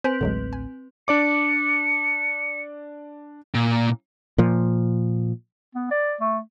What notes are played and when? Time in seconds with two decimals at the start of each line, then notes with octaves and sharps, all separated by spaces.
0.04 C4 B4 C5 G#5
0.21 A1 D2 A2 D3 F#3 G#3
0.53 G#5
1.08 D4 D5 D6 C#7
3.55 A#2
4.38 A#2 F3
5.75 B3
5.91 D5
6.21 A3